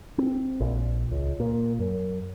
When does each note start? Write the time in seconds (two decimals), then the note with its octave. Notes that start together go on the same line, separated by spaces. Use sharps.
0.18 C4
0.61 A#1
1.12 C#2
1.40 A#2
1.79 F#2